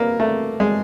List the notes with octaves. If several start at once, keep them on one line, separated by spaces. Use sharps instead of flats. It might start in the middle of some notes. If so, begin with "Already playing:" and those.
Already playing: A#3 B3
A3
G#3